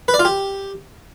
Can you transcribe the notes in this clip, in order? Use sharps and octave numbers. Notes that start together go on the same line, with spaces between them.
B4
D5
F4
G4